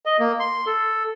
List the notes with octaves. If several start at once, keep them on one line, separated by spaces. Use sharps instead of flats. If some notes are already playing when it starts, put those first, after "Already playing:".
D#5
A#3
C6
A4